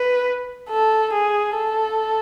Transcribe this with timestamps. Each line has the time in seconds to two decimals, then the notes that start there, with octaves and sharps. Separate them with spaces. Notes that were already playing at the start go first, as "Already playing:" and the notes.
Already playing: B4
0.70 A4
1.13 G#4
1.57 A4